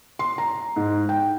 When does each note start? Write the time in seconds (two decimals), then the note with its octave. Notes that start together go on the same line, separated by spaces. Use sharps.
0.19 C6
0.38 A#5
0.76 G#2
1.09 G5